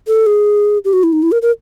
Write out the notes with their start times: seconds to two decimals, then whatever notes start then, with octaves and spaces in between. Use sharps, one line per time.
0.07 A4
0.26 G#4
0.85 G4
0.93 F#4
1.03 E4
1.13 D#4
1.23 E4
1.32 A#4
1.42 A#4